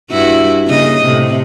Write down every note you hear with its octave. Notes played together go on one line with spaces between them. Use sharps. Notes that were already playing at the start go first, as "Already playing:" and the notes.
G2 E4 F#4
C#3 A#3 D#5
A2 C3